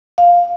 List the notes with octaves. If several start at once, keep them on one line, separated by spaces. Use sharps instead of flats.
F5